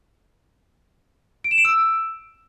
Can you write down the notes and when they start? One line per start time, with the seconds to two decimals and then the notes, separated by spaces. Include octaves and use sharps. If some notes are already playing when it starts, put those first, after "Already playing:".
1.44 D7
1.51 E7
1.58 D7
1.65 E6